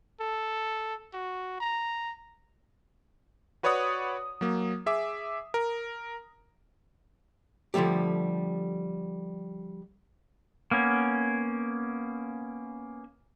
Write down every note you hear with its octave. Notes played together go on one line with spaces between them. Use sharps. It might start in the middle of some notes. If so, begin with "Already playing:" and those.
A4
F#4
A#5
F#4 B4 C#5 D5 F#5 D#6
F#3 A#3
G#4 E5 D6
A#4
D3 F3 G3 A3 G4
A#3 B3 C#4